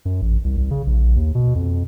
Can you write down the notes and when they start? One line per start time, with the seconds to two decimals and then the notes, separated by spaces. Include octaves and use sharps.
0.05 F#2
0.22 A1
0.44 C2
0.57 C2
0.71 C#3
0.87 A#1
1.16 D#2
1.35 B2
1.55 F2